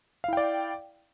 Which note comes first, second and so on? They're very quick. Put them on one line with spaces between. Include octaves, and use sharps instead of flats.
F5 E4 G5 D5